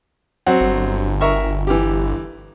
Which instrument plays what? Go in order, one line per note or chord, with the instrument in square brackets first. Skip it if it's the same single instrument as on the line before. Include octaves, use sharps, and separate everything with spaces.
[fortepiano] F#3 C4 F#5
[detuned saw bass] G1
[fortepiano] A#4 E5 C#6
E3 G4